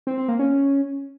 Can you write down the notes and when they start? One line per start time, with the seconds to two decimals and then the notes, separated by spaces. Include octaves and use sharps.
0.07 C4
0.18 C4
0.28 A#3
0.39 C#4